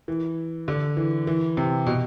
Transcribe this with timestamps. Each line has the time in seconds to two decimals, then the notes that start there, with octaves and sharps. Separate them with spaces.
0.08 E3
0.68 D3
0.97 E3
1.27 E3
1.57 C3
1.87 B2